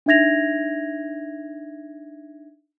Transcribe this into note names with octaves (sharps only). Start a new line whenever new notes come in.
D4 D#4 E5 G#6 A#6 F7